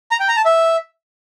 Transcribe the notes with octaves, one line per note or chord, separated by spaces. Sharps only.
A#5
G5
A#5
A5
E5